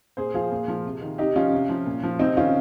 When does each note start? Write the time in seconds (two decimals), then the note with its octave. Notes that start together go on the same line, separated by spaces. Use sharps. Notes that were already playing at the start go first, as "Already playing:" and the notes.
0.17 A#2 G#4 C5
0.34 F3 F4 G#4
0.52 A#2
0.68 F3
0.85 C3
1.02 D#3
1.18 C3 D#4 G4
1.36 F3 C#4 F4
1.53 C3
1.69 F3
1.86 A#2
2.03 F3
2.19 C3 C4 D#4
2.36 D#3 C#4 F4